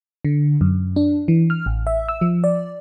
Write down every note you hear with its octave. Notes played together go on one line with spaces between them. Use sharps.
D3
F#2
D4
E3
F6
A1
E5
E6
F3
D5